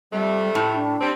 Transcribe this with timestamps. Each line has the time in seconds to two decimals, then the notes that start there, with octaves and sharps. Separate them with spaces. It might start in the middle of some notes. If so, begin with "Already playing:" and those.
0.12 F2 C3 G3 A3
0.55 A2 E4
0.75 D4
1.01 G3 C4